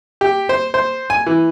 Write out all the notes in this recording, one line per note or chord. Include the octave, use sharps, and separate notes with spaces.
G4
C5
C5
G#5
E3